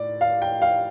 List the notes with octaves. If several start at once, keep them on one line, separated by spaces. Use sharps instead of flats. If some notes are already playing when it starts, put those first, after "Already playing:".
Already playing: A2 D5
F5
G5
F5